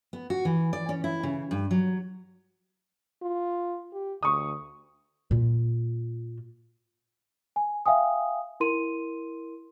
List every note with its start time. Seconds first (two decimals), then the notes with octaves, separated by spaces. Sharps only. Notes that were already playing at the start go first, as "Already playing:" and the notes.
0.13 B3
0.30 F#4
0.45 E3
0.73 D5
0.89 C#4
1.04 E4
1.23 C#3
1.51 G2
1.71 F#3
3.23 F4
3.93 G4
4.23 D2 C#6 D#6
5.31 A#2 F4
7.56 G#5
7.86 E5 F5 G5 G#5 D#6
8.60 E4 A#4 C6 D#7